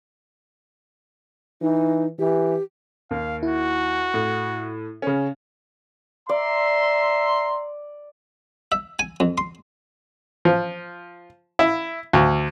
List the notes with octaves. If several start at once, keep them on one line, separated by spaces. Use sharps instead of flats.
E3 D#4
E3 G4
D#2 F5
E4 F#4
A2
C#3 C#4
D5 E5 A#5 C6
E5
G#5
F2
C6
F3
E4
D2